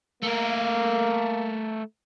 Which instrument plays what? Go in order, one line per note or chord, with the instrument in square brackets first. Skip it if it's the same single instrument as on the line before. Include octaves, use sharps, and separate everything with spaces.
[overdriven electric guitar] A3 A#4 [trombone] A#3